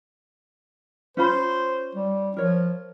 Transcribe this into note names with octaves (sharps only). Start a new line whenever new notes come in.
C#4 F4 C5 B5
G3
F3 A#4 C#5